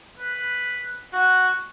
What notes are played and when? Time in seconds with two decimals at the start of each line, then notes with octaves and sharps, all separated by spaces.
0.19 B4
1.13 F#4